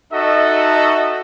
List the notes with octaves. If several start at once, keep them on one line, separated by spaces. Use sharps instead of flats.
D#4 F#4 A4 D#5 E5